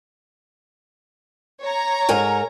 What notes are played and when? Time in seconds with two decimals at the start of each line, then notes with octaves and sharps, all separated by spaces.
1.62 C#5 A#5
2.09 G#2 A#4 G#5